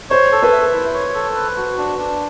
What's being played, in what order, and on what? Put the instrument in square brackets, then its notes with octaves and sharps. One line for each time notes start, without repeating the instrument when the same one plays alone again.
[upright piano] C5 [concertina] C#5
[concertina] A4
[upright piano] B4
[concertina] E5
E4
C#5
A4
B4
F#4
D4
D4